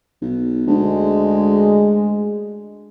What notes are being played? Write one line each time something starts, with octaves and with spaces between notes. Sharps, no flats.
B1
D2 G#3